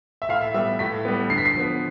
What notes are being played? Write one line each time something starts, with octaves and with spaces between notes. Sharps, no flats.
E5
A2 F5
E5
G3 B3 E5
A2 B6
G3 B3
D3 C7
B6
C7
F3 B3